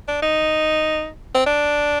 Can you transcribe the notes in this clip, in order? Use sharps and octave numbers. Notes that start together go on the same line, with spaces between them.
D4
D#4
C4
D4